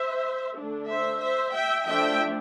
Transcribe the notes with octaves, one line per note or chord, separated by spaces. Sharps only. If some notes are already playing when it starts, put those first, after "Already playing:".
Already playing: C5 E5
D3 A3 D4
C5 E5
C5 E5
E5 G5
F3 A3 D4 E5 G5